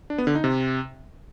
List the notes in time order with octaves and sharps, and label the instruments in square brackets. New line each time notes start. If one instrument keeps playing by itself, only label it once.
[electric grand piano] D4
B3
D3
D#4
C3